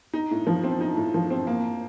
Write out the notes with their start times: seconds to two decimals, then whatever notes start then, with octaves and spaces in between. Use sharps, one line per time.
0.13 D#4
0.31 A2
0.47 F3
0.64 C4
0.81 D#4
0.97 A2
1.14 F3
1.31 C4
1.47 A#3